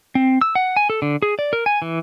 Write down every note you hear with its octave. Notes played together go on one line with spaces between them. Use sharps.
C4
E6
F#5
G#5
A4
D3
G#4
D5
A#4
G#5
E3